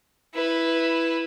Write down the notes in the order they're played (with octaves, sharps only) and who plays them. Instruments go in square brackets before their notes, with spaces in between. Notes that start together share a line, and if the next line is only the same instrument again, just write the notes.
[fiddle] E4 B4